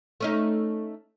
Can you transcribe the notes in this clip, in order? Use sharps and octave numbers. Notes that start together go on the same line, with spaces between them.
A3 C#4 D#4